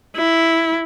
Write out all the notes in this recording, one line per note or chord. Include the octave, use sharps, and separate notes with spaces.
E4